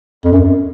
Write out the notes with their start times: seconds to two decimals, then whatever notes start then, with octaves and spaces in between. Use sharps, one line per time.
0.25 F2
0.32 F#2